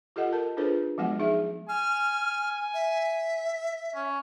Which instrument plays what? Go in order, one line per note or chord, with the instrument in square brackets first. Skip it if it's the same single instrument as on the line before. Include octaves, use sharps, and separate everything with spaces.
[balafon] F4 G4 A4 D#5 F#5
A4 A#4 A5
D4 F4 G#4 A4 B4 C5
F3 F#3 G#3 B3 F#4 F#5
D#4 G#4 E5
[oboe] G#5 [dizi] F6
[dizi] E5
[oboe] C#4